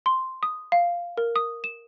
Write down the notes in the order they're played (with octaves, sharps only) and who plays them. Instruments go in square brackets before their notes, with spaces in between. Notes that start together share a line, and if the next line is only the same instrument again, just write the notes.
[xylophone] C6
D#6
F5
A#4
D#6
E7